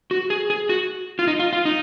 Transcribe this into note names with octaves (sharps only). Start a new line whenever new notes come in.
F#4
G#4
G#4
F#4
F4
D#4
F4
F4
D#4